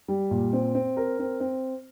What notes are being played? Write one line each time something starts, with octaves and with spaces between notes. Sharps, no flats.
G3
A#2
C4
C4
A#4
C4
C4